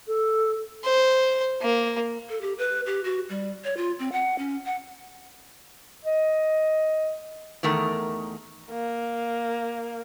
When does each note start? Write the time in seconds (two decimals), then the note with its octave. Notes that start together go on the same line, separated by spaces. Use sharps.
0.08 A4
0.84 C5
1.62 A#3
2.29 A4
2.42 G4
2.58 B4
2.86 G4
3.04 F#4
3.29 G3
3.64 C#5
3.77 F4
3.99 C4
4.12 F#5
4.39 C#4
4.66 F#5
6.05 D#5
7.63 E2 D#3 A3 A#4
8.71 A#3